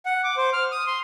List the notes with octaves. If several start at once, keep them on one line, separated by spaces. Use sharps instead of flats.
F#5
D6
C5
F6
D#6
C6